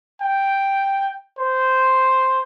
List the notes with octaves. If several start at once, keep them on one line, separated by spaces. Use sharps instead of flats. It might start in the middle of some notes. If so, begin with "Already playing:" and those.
G5
C5